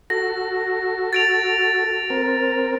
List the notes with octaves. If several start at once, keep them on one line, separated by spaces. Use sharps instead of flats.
F#4 A4 A#6
A6 D7 F7
C4 A#4